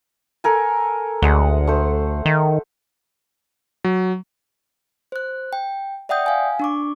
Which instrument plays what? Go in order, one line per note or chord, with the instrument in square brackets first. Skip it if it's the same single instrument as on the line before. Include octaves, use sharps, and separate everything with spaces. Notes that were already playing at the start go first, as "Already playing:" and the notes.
[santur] A4 A#4 G#5
[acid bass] D2 [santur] G#3 F#5
[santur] A3 C5
[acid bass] D#3
[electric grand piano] F#3
[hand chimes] C5 F#6
G5
D5 E5 F#5 G5 D#6 G6
F5 G#5
D4 C#6 D6